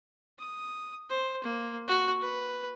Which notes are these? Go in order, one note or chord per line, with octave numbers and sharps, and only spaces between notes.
D#6
C5
A#3
F#4
B4